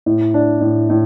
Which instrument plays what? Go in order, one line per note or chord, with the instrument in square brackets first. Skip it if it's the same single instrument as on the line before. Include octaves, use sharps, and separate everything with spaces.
[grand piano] A2
D4
A2
A2